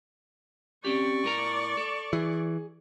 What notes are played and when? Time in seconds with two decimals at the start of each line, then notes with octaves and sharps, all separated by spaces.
0.85 C4 C#4 G4 D5 C#6
1.24 A2 A#4 A#5
1.77 A4
2.13 E3 G#4